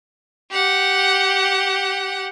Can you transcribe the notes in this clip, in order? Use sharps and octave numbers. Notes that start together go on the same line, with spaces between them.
G4 F#5